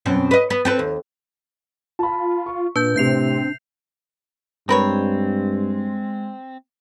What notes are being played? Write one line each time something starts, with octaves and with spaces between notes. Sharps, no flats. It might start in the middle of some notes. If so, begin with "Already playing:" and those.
F#2 B2 C4
B4 D#5
B3
C4 A4 B4
D#2
F4 A5 B5
C#6
A#2 D4 B4 G6
A2 C3 C4 G6 C7 F7
G2 G#3 C4 A#4 B4 C#5